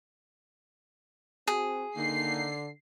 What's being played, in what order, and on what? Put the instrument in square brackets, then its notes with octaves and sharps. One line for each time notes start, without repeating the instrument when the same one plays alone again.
[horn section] C4 F#4 [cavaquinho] G#4
[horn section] D3 [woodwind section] D#3 A#3 D#4 [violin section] C7